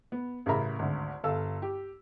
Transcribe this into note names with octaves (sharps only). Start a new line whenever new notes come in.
B3
A1 C#3 A#4 E5 A#5 B5
G#1 D2
G1 A4 F5 E6
G4